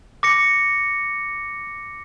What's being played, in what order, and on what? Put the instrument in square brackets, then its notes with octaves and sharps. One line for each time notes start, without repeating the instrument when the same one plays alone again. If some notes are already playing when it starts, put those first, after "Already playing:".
[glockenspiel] D6 A#6 C#7